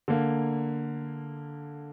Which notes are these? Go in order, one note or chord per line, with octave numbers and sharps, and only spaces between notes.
D3 A#3